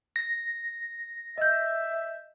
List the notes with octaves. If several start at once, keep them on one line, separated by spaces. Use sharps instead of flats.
A#6
D#5 E5 G6